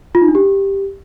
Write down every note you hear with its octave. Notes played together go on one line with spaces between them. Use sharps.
F4
D#4
D4
G4